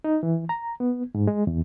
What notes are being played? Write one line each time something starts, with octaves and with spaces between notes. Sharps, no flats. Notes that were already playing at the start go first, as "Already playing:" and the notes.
D#4
E3
A#5
B3
G#2
G#3
E2